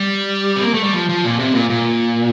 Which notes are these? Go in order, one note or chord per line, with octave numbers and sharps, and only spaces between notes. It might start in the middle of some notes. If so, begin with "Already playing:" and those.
Already playing: G3
C4
A#3
A3
G3
F3
F3
A#2
C3
A#2
A#2